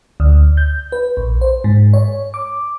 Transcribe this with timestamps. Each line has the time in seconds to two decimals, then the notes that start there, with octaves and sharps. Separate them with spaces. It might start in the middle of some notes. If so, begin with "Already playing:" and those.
0.20 D2
0.57 G6
0.92 B4
1.17 A#1
1.41 C5
1.64 G#2
1.93 C#5
2.34 D6